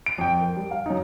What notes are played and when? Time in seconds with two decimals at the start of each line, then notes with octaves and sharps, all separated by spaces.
0.06 D7
0.18 F2 G5
0.40 A#4
0.56 G3
0.71 F5
0.86 F#2 C#4 D#4